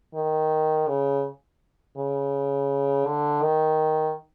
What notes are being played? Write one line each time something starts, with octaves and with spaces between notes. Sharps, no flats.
D#3
C#3
C#3
D3
D#3